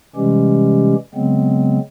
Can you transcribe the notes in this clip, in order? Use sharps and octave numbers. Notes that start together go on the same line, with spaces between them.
C3 E3 G3 G#3 C#4 G4
C#3 F#3 G#3 B3 C4